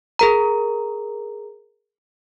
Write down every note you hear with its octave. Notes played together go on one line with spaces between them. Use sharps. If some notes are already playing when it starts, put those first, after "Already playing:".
G#4 A#4 A#5